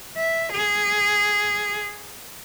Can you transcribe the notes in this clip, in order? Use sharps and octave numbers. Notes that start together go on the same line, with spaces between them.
E5
G#4